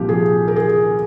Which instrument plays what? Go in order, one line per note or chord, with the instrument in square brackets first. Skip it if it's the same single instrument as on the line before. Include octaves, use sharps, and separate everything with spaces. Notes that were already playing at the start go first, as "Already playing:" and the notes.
Already playing: [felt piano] C2 A#2 F3 G4
G#4
A#4
G#4